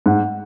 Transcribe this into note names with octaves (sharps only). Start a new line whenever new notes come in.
G#2 F#5